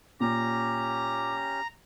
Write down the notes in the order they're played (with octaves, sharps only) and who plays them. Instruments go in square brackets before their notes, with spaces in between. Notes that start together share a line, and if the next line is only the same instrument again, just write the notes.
[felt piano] A#2 [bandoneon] C#4 G4 [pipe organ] A#5 [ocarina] D6